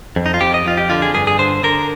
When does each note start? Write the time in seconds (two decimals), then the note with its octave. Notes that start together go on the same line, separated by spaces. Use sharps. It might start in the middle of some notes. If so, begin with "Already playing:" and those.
0.16 F2
0.26 D#4
0.34 F4
0.41 F2 G4
0.54 D#5
0.66 F2 F4
0.77 G4
0.90 D3 F4
1.02 G#4
1.14 G2 G#4
1.27 G#4
1.39 D3 C5
1.63 D3 A#4